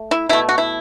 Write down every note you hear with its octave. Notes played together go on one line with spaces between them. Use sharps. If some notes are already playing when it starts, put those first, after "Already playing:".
Already playing: A3
E4
B2 A3 E4
F#4
E4